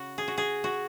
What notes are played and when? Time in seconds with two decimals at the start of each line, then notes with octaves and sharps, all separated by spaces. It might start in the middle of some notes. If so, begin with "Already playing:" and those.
Already playing: C#3 F#4
0.18 G#4
0.28 F#4
0.38 G#4
0.64 F#4